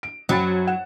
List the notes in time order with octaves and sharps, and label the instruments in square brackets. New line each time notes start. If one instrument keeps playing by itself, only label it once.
[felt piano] D7
[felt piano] F#2 B5 A6 [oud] F#3
[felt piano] F#5 E7